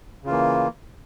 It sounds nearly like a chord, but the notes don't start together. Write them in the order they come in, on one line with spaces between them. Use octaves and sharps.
C#3 F4 E3 A#3